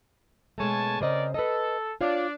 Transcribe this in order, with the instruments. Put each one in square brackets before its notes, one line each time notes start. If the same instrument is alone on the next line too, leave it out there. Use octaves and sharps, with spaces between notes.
[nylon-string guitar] B2 G#3 A3 [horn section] C#5 G#5 A5
[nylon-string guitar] C#3 C5 D#5 [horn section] C4 A#4 D5
[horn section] A4 [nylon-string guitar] B4 D#5
[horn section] D4 D5 [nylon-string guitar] F4 C#5 F5